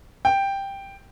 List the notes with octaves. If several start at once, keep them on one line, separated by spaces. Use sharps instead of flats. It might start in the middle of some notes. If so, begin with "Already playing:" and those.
G5